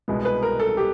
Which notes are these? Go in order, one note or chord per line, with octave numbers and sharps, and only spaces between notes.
C2 B2 G#3 B3
B4
A#4
A4
G4